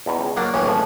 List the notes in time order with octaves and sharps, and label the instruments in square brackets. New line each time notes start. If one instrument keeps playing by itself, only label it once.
[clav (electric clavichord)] E2 B2 A#5
C#2
[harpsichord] F#3 A#3 D4
[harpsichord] A1 E3 C#4 [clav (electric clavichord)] A2
[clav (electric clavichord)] G#1 F3